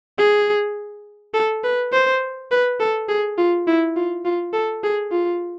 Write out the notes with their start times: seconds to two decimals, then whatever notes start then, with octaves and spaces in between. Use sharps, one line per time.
0.18 G#4
1.34 A4
1.64 B4
1.92 C5
2.51 B4
2.80 A4
3.09 G#4
3.38 F4
3.67 E4
3.96 F4
4.25 F4
4.53 A4
4.84 G#4
5.11 F4